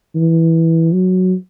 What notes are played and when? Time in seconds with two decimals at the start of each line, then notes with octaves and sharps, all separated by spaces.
0.15 E3
0.93 F#3